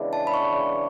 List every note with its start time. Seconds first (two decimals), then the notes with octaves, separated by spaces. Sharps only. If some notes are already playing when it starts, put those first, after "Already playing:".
Already playing: E2 C#3 E3 G#3 D4
0.13 A5
0.27 B5
0.34 C#6